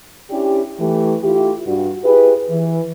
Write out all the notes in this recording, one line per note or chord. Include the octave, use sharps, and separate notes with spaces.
C#4 D4 E4 G4
E3 A3 G4
A3 E4 F4 G4
G2 F#4
E4 G4 G#4 B4
E3